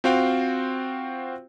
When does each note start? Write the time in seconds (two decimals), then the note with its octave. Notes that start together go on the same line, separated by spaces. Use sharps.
0.04 C4 F4 F#4 C5 F5 G5